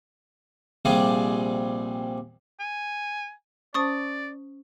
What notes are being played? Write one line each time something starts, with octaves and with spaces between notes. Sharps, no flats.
A#1 C3 G3 F4 G#4 D5
G#5
C#4 C5 D5 A5 C#6 D#6 A6